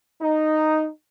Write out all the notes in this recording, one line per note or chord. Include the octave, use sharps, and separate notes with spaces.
D#4